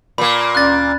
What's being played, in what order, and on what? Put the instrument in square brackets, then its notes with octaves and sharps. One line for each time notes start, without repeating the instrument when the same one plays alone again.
[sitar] A#2 A#3 [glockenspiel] B5
[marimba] D2 C#4 D5 [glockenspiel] F#6 A6